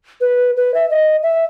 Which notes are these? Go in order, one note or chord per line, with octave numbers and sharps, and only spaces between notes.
B4
B4
E5
D#5
E5